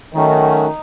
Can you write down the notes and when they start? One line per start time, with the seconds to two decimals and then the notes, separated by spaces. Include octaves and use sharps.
0.14 D#3 F#3 A3 C#4 F#4
0.67 D#4